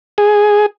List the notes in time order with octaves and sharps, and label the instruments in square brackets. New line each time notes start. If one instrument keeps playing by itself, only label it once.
[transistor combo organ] G#4